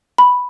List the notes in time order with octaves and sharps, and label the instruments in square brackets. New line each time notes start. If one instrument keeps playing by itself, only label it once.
[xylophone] B5